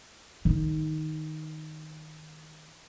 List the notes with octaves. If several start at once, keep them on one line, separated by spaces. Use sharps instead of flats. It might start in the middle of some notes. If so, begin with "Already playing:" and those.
D#3 D#4